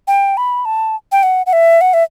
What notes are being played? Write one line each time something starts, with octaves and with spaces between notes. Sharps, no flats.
G5
B5
A5
G5
F#5
F#5
E5
F#5
E5